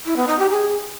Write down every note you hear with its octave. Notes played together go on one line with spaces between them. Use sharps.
E4
B3
D#4
G4
G#4